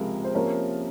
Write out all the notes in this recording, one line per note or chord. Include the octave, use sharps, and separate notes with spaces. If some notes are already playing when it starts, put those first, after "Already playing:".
Already playing: C#2 C3 F3 G#3 A#4
C5
C3 F3 A#3 C#4 A#4